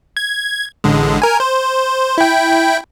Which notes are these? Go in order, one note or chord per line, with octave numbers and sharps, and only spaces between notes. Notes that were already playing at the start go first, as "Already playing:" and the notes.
G#6
A1 D3 G#3
A#4 G#5
C5
E4 G5